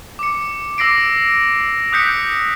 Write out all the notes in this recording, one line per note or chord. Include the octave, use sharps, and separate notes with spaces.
D6 C#7
D6 E6 A#6 C7 D7
D#6 F#6 G6 B6 C#7